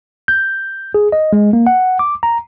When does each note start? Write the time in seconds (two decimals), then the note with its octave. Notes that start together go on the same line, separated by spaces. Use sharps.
0.28 G6
0.94 G#4
1.12 D#5
1.33 G#3
1.53 A#3
1.67 F#5
1.99 D6
2.23 A#5